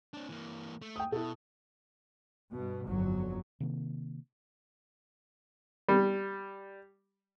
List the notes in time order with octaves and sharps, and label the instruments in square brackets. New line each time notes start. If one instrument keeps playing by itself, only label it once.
[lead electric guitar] C4 D4
E3 A#3
A3
[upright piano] G5 D#6
[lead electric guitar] B2 [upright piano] E4 A4
[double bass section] G2 B2
G1 F2 F#3
[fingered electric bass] C3 D#3 A#3
[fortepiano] G3